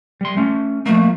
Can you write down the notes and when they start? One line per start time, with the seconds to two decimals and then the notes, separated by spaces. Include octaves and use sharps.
0.21 G3 C6
0.37 A3 C#4
0.86 F3 A3 A#3